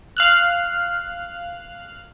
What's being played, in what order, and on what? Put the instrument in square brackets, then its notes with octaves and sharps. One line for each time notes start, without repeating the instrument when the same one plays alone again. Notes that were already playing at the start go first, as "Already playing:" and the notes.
[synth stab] F5 F6 F#6